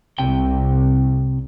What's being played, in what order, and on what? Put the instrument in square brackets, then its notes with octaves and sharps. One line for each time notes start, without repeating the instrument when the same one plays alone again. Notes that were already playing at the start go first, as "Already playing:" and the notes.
[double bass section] C2 [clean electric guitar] C3 G5